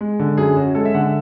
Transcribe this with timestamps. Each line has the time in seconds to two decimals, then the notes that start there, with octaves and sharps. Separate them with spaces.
0.01 G#3
0.19 D3
0.38 F#2 G#4
0.56 C#4 F#4
0.75 G#3 A4
0.85 E5
0.94 D3 F#5
1.03 E5